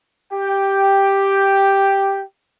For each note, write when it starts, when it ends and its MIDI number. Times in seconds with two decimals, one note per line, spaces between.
0.32 2.22 67
0.32 2.22 79